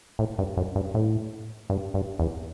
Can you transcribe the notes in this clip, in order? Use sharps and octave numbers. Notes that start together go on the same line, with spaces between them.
A2
G2
F#2
G2
A2
G2
G2
E2